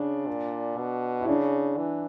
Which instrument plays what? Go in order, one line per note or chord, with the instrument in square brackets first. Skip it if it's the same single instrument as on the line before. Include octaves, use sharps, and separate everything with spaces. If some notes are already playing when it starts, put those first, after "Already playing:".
Already playing: [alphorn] C#3 [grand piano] D4
[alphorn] A#2
B2
[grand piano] E4
[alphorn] C#3 [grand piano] D4
[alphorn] E3